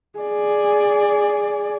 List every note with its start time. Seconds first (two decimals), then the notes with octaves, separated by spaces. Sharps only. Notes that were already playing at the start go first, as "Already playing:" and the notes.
0.19 G#4 D5